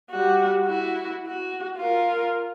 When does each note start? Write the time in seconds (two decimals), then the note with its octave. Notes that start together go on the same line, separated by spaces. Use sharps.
0.11 G3 F#4
0.66 E4 F#4
1.27 F#4
1.78 F4 A#4